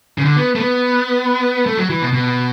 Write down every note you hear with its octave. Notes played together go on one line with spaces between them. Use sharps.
C#3
D3
B3
A3
B3
A3
F#3
E3
B2
B2